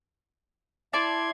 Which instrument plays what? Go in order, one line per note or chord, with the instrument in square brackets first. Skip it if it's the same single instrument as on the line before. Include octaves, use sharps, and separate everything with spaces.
[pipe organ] E4 C6 G#6 [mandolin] D5 A5